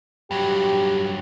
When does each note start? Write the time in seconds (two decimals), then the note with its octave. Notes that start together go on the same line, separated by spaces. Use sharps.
0.31 G2 F#3 G4